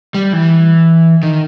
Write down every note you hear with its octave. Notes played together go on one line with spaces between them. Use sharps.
G3
E3
D#3